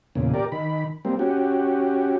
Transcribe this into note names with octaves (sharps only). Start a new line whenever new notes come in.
E2 A#2 C#3
G4 A#4 D5
D#3 B5
G3 A#3 C4
C#4 F#4 G4